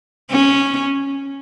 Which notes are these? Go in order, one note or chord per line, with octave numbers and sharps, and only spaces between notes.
C#4